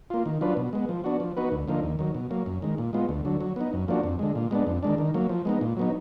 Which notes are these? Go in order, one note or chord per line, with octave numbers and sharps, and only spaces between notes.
A#3 F4
D#3
F#3 D4 F4 B4
B2
G#3 B3
F3
B3 D4 F#4
F3
B3 D#4 F#4 B4
D2
D3 F3 A#3 D#4
D#2
D#3 F#3
B2
F#3 A#3
F#2
D#3 G#3
A#2
G#3 B3 F4
D2
D3 F#3
F#3
B3 D#4
F#2
F3 A#3 D4 F#4
F2
D3 G#3
A#2
G#3 B3 D4
F2
D#3 G#3 D4
D#3
F#3 A#3
F3
G#3 B3 D#4
A#2
F#3 B3 D#4